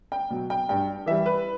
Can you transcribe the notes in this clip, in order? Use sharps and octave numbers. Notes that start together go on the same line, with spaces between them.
G5
B2 F#3
G5
G2 G5
E3 G3 E5
B4